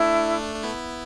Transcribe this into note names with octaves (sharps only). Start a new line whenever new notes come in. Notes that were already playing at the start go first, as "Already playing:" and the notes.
Already playing: A3 D4 E4
D4
B3 E4